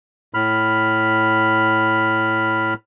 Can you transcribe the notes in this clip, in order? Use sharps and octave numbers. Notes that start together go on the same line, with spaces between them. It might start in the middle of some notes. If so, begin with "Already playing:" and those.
A2 B5 F6